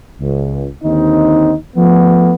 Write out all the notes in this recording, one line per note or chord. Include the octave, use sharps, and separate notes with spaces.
C#2
D#2 D3 C4 D#4
F3 A3 B3